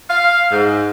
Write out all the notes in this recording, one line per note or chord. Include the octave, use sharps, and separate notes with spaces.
F5
G#2